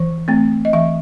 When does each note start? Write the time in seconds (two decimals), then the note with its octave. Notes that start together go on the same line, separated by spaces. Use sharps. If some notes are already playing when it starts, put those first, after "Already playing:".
Already playing: E3 C5
0.28 A3 C4
0.65 D#5
0.73 E3 E5